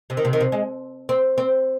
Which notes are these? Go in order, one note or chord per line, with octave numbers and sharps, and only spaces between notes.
C3
D#3
C3
D#3
C3
G#3
C4
C4